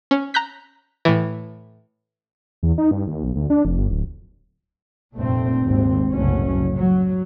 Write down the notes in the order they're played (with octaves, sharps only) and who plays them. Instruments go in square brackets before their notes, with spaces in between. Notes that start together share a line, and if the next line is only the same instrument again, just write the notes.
[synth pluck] C#4
A#5 F#6 G6 B6
A2 E3
[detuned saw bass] E2
D#4
G2
D#2
B1
D2
D4
F1
G1
D1
[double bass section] F1 G2 A#2 A3 C4
G#1 D#2 C4
F#1 C2 A2 F#3 A3 C#4
F#3